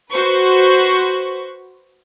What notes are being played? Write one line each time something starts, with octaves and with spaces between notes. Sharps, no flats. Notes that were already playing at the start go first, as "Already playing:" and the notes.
F#4 B4 C5 C#6